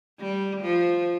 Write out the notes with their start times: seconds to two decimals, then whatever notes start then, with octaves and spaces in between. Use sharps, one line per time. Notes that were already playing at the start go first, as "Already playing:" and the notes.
0.20 G3
0.62 F3